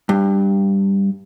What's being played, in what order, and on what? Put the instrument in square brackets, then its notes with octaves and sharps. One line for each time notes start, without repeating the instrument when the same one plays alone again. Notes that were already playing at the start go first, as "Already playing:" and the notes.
[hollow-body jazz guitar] G2